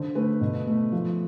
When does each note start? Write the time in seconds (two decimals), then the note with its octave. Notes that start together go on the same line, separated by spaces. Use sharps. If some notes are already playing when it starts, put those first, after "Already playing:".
Already playing: D3 C5
0.15 A3 B4
0.41 B2
0.67 A3
0.92 F3